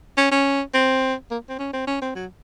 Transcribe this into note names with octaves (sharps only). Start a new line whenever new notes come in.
C#4
C#4
C4
A#3
C4
C#4
C4
C#4
C4
F#3